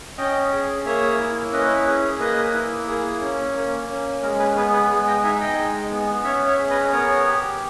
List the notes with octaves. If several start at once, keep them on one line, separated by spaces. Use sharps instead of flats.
C#4 D#5 G5
G#4
A#3 C#5 E5
E4
C#4 B4 D#5
G#4
A#3 B4 D#5
E4
A#3 G#4
C#4
A#3
C#4
G#3 A#4
G#4 B4
B3 G#4 B4
G#4 B4
G#3 G#4
D#5 G5
D#4 E5 G#5
D#5 G5
G#3
B3
C#4 C#5 E5
C#5 E5
G#4
B4 D#5
B3 A#4 C#5
G4